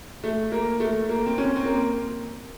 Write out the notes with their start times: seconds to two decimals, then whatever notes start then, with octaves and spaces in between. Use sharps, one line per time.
0.24 A3
0.52 A#3
0.80 A3
1.09 A#3
1.26 C4
1.38 C#4
1.56 C4
1.65 A#3